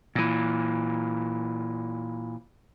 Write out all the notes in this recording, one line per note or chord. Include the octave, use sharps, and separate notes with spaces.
A#2 E3